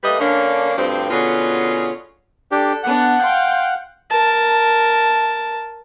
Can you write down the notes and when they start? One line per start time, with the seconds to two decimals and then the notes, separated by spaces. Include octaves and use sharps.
0.04 G3 A3 A#3 B4 D#5
0.19 D3 A#3 C#4 D4
0.78 D2 G2 F3 C4
1.10 B2 D3 C#4 F4 G#4
2.52 D4 G4 A4
2.83 B3 D4 F#5
3.21 F5 G5 C6
4.10 A#4 A5